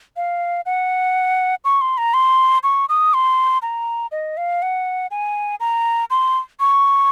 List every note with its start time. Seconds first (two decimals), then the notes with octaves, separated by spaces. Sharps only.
0.16 F5
0.66 F#5
1.64 C#6
1.81 C6
1.98 A#5
2.14 C6
2.63 C#6
2.89 D#6
3.14 C6
3.62 A#5
4.12 D#5
4.37 F5
4.62 F#5
5.11 G#5
5.60 A#5
6.10 C6
6.60 C#6